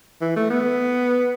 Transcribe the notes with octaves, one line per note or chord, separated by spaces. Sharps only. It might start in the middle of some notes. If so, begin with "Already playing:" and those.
E3
A3
B3